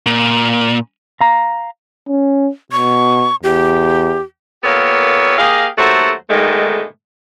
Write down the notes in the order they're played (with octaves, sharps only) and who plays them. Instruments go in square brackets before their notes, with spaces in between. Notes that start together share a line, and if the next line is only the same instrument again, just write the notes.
[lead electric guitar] A#2
[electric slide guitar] F5 A#5
[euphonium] C#4
[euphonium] B2 [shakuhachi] C#6
[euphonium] E2 [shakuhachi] G4
[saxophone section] A#2 A#3 B3 G4 A4 C#5
A#3 G4 G#4 D#5 F5
D#2 F#3 A3 F#4 A4 C5
G#2 B2 D3 D#3 G#3 A3